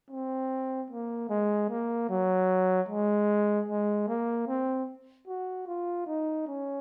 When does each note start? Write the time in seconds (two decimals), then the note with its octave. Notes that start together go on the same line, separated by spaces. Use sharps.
0.10 C4
0.90 A#3
1.29 G#3
1.70 A#3
2.09 F#3
2.89 G#3
3.68 G#3
4.08 A#3
4.48 C4
5.27 F#4
5.67 F4
6.07 D#4
6.47 C#4